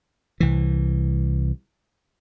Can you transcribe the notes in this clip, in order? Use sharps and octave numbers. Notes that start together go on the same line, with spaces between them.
C2 E3